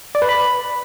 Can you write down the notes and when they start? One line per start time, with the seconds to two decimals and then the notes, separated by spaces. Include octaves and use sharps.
0.15 D5
0.22 B4
0.29 B5